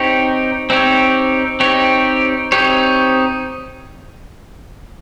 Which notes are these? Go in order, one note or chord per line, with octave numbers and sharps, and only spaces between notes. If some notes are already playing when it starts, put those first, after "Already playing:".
Already playing: C4 D#4 G4 C#5
C4 D#4 G4 C#5
C4 D#4 G4 C#5
C4 D#4 G4 C#5